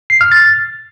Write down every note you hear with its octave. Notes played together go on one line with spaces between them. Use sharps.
C7
F6
A6